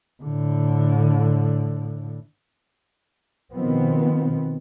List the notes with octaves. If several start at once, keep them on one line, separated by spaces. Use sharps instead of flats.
A2 D3
B2 D#3 F3 B3 C4